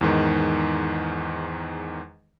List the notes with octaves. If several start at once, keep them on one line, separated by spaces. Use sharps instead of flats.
E2 G#2 D#3